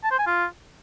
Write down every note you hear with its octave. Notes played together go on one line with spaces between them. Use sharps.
A5
C5
G#5
F4